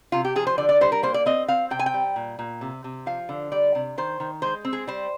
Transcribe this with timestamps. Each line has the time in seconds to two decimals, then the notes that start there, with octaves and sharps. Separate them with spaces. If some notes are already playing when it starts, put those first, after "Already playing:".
0.12 C3 F4
0.25 G4
0.36 F3 G#4
0.47 C5
0.58 D3 D5
0.69 D5
0.81 G3 C5
0.92 A#4
1.03 A#3 C5
1.14 D5
1.26 C4 D#5
1.48 C4 F5
1.71 C3 G5
1.79 G#5
1.86 G5
1.94 G3
2.16 A#2
2.39 A#2
2.61 C3
2.84 C3
3.06 F3 F5
3.29 D3
3.52 G3 D5
3.75 C3
3.98 D#3 C5
4.20 D#3
4.42 G#3 C5
4.65 C4
4.73 G#4
4.87 G3 C5